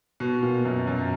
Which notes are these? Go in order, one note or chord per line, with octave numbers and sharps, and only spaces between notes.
B2
A#2
F#2
F#2